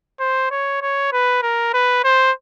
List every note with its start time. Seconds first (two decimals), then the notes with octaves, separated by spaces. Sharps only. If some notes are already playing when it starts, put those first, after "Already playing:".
0.20 C5
0.50 C#5
0.82 C#5
1.13 B4
1.43 A#4
1.74 B4
2.04 C5